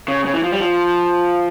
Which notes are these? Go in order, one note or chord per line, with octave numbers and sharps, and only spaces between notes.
C#3
C#3
E3
F3
G3
F3